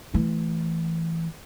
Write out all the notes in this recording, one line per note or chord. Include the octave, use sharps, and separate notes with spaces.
E3 A3